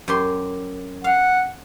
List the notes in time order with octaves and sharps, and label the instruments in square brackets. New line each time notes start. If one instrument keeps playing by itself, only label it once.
[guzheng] F#2 G4 C6
[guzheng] F5 [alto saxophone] F#5